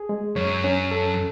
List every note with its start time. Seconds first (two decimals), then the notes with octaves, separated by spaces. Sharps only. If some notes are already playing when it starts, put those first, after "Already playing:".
Already playing: G#4
0.09 G#3
0.36 F#2 C#5
0.64 C#4
0.91 A4